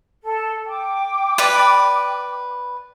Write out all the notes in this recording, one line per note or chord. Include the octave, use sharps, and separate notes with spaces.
A4
G5 D6
B4 D5 B5